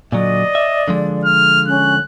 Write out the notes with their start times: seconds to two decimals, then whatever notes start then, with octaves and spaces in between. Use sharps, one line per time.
0.12 A#2 D3 F#3 D5 D#5
0.55 E5
0.88 D3 F3 G#3
1.25 F6
1.68 C#4 F#6